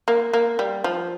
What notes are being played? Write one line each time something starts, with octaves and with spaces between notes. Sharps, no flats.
A#3
A#3
G3
F3